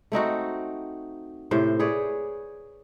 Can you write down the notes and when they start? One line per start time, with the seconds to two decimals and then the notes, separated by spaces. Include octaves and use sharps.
0.12 A3 C4 D#4 F#4
1.51 A2 C3 C5
1.79 G#4 B4 C#5 D5